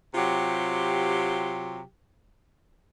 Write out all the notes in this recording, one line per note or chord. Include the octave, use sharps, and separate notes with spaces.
C3 F#3 F4 G4